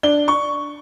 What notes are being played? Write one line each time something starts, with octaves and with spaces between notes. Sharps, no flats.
D4 G7
C#6